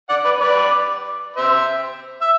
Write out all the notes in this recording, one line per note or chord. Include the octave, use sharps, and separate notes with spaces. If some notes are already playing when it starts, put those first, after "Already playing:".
D5 F#5
B4 D5
B4 D5
C5 E5
E5